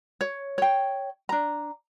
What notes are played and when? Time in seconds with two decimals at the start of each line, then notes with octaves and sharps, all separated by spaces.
0.21 C#5
0.58 C#5 G5
1.29 D4 A#5